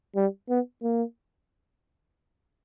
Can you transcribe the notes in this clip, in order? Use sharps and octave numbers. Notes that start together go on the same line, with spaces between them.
G3
B3
A#3